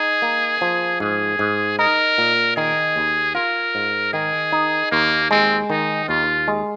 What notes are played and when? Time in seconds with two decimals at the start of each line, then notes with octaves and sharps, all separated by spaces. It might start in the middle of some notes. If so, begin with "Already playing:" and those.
Already playing: D#4 G#4
0.22 A#3
0.61 F3
1.00 G#2 G#4
1.39 G#2
1.79 D#4 A#4
2.18 A#2
2.56 D#3 G#4
2.96 D#2
3.35 F4 A#4
3.75 G#2
4.13 D#3 G#4
4.52 D#4
4.92 D#2 A#3
5.31 G#3 C4
5.70 D#3 D#4
6.09 D#2 F4
6.48 G#3